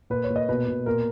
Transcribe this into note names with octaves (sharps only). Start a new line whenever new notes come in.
A#2 B4
C#5
A#2
D#5
B2 B4
B2
A#2 A#4